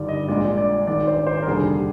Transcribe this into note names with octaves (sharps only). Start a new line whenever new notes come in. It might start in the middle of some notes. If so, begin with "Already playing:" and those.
Already playing: G1 G2 D#3 G3 D5
D#5
A#1 A#2 G#3 D5
D5
G#1 G#2 D#3 D5
C5
C5
A#4
F1 D#2 D3 G3 G#4
G4